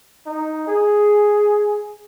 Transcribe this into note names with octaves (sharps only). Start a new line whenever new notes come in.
D#4
G#4